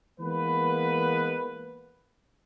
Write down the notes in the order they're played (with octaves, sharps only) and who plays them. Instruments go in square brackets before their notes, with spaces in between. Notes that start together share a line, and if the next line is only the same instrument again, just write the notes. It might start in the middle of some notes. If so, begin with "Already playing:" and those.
[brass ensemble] E3 G#3 A#3 B3 B4